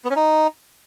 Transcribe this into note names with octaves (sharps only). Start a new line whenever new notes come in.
B3
C#4
D#4